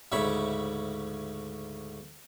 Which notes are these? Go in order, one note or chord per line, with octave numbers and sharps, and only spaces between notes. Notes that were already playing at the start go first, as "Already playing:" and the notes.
D2 G#2 C#3 C#5 E5 B5